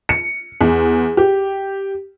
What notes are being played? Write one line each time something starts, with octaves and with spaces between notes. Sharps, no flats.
C#7
E2
G4